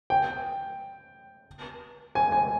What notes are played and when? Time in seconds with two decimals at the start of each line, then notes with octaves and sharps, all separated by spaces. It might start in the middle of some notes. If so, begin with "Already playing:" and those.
0.10 G5
2.15 G#5
2.32 G#5